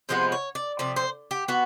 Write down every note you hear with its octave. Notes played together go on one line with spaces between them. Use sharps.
C3 F3 G#3 B3 C5
C#5
D5
C3 F3 D5
C5
G4
B3 F#4